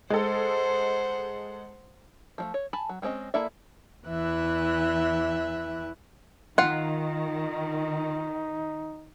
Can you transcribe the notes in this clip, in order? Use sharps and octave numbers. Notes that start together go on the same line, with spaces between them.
G#3 A4 C5 F#5
F3 G#3 A3
C#5
G#5 A5 B5
F#3
G3 G#3 C4 C#4 D#5
A#3 E4 A4 D5 E5
E2 E3 E5 F#6
D#3 D#4 F4 F#5